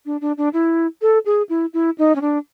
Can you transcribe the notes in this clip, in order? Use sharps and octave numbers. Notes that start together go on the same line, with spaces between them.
D4
D4
D4
E4
A4
G#4
E4
E4
D#4
C#4
D4